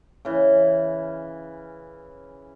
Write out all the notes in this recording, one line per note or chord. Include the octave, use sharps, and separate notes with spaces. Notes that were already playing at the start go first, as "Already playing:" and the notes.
C#3 E3